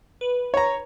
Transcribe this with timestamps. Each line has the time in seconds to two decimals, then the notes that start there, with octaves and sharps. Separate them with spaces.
0.21 B4
0.54 C#5 A#5